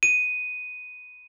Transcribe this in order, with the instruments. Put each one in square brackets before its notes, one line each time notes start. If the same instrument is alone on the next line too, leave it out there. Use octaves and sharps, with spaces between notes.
[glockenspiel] D#7